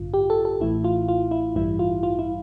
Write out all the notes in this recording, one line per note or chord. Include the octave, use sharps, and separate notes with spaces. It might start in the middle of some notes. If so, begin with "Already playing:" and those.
Already playing: A1 G2 D3 F4
G4
A4
A4
A1 A2 E3 E4
F4
F4
E4
A1 G2 E3 G3 E4
F4
F4
E4